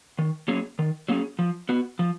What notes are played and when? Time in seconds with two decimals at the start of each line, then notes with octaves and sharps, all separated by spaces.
0.19 D#3
0.48 F#3 A#3 C#4 G#4
0.79 D#3
1.09 F#3 A#3 C#4 G#4
1.39 F3
1.69 B3 F#4
1.99 F3